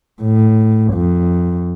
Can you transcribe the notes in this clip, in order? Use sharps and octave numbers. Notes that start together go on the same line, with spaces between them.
A2
F2